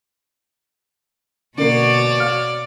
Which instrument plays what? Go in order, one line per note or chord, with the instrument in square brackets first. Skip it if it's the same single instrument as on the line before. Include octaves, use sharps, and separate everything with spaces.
[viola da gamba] B2 F#4 C#5 [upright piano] D3 A#3 C7 [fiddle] D5
[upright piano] F5 F6